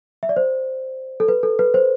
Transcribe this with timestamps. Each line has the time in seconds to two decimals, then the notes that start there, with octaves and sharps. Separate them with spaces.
0.23 E5
0.29 D5
0.37 C5
1.20 A4
1.28 B4
1.43 A4
1.59 B4
1.74 C5